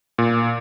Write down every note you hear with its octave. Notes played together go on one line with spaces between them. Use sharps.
A#2